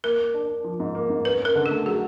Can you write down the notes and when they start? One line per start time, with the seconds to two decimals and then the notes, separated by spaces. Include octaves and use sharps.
0.04 A#3 A#4
0.19 A#3
0.34 D4
0.49 D4
0.64 F3
0.80 G#2
0.95 A#3
1.10 G#2
1.25 C#4 B4
1.40 C#4
1.45 A#4
1.55 D3
1.66 A3 A4
1.86 F#3 G#4